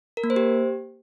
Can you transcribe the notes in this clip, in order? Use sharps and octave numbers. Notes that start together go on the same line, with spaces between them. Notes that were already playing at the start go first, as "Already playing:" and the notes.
A#4
A#3
C5
G4